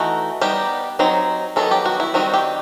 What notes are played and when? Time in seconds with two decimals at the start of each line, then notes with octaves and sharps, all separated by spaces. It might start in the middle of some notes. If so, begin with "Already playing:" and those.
Already playing: E3 A3 D#4 F#4
0.41 G3 B3 D#4 G4
0.99 F#3 C4 D#4
1.56 D#3 F#3 B3 D#4 A4
1.71 G4
1.85 F#4
2.00 E4
2.14 D#3 G3 C4 D#4 F#4
2.34 G4